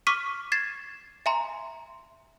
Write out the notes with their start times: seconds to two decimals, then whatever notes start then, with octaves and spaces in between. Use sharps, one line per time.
0.07 C#6 D6 F6 B6 D#7
0.52 G#6 A6 C7 E7
1.26 E5 G#5 A#5 C6